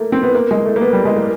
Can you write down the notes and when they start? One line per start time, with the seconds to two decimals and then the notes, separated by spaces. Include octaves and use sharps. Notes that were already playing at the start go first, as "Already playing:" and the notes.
Already playing: A3 A#3
0.12 C4
0.23 B3
0.35 A#3
0.51 G#3
0.65 A3
0.76 A#3
0.81 B3
0.93 G3
1.05 G#3
1.17 A#3